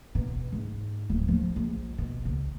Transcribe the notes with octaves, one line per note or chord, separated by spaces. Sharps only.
B2
G#2
D1
F3
A#1
B2
C#2